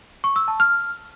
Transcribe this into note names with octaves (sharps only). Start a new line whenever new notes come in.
C#6
E6
A5
F6